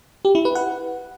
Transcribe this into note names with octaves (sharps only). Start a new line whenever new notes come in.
G4
E4
B4
F#5